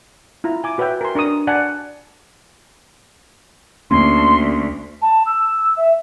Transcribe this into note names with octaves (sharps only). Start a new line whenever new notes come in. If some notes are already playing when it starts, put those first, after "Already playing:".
E4 F4 A#5
E4 G#5 D6
F#4 B4 C#5 E5 G5
A#4 G#5 C6
D4 A#4 C#6 D#6
D5 F#5 G#5 A5
D2 A#3 C#4 C6
A5
E6
E5